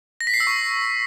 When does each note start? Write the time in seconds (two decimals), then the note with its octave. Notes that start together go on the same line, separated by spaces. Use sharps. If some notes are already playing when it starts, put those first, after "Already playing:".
0.21 A#6
0.27 B6
0.34 C7
0.40 E6
0.47 C#6